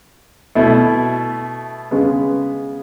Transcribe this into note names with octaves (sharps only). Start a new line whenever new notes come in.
B2 A3 E4
C#3 G#3 B3